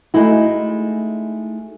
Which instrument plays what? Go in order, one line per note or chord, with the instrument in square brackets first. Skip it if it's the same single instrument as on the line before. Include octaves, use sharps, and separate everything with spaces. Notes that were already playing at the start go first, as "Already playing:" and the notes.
[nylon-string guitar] G#3 A3 D#4 E4 F#4